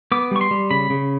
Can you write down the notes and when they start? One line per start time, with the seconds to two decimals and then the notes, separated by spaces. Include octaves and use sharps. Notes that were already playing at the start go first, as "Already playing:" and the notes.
0.12 B3 D6
0.31 G3 C#6
0.41 C6
0.51 G3
0.71 C#3 B5
0.90 C#3